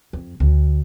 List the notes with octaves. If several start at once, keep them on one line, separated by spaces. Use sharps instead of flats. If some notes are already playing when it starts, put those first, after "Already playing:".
F2
D2